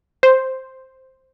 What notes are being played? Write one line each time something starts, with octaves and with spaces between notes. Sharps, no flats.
C5